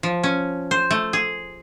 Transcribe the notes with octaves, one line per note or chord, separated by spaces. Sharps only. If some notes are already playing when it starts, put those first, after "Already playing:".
F3
C#4
C5
A3
G#4